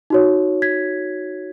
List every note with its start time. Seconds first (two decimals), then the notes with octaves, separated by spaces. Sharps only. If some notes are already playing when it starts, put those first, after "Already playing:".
0.10 D#4 F#4 C#5
0.62 G#6 B6